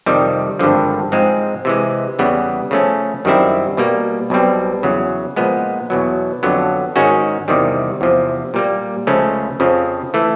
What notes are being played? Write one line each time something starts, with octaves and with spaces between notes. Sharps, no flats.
F2 C3 D#3 G3
G#1 G2 D3 F3
G#2 F3 G#3 C4
C3 E3 G#3
E2 C#3 E3 G3 B3
C#3 F3 A3 C#4
F#2 D#3 G3 C4 E4
B2 G3 A#3
B1 B2 G3 C4
E2 C#3 F#3
A#2 F3 G#3 B3
E2 B2 F#3
F2 D3 F#3 B3
G#2 D#3 G#3 C#4 F#4
E2 C3 D#3 G3
E2 C3 F3
A#2 G3 A#3
C#2 C#3 F3 A3 C#4
F2 C#3 F3
E3 A3